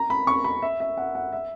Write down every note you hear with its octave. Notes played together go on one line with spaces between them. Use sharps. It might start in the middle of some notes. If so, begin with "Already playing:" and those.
Already playing: A#5
B5
C#6
B5
E5
E5
F#5
F#5
E5